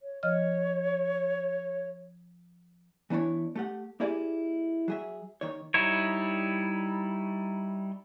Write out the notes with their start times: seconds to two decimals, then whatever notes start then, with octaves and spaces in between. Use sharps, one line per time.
0.01 C#5
0.23 F3 C#5 D#5 F6
3.10 E3 B3 D4 E4 C#5
3.55 A3 G4 F#5
4.00 A#3 E4 G4 G#4 D5 D#5
4.88 F#3 G#4 E5
5.41 D#2 D#3 C#5
5.74 G3 D#4 E4 C#5